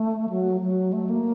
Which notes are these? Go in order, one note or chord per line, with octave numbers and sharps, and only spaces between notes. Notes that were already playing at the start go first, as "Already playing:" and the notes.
Already playing: A3
F#3
F#3
A3
A#3